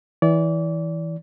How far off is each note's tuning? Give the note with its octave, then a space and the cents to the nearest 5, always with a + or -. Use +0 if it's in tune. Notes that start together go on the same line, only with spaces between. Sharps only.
E3 -15 D5 -30